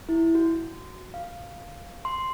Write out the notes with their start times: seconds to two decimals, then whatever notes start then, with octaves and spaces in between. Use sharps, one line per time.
0.09 E4
0.35 F#4
1.14 F5
2.05 C6